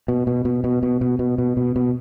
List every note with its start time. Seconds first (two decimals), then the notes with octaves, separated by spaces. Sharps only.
0.08 B2
0.27 B2
0.45 B2
0.64 B2
0.83 B2
1.01 B2
1.19 B2
1.38 B2
1.57 B2
1.76 B2